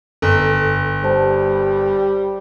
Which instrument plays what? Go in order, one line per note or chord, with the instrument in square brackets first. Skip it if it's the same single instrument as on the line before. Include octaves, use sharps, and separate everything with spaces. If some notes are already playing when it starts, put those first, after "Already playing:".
[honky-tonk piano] G1 [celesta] A4
[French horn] G3 [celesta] C5 A5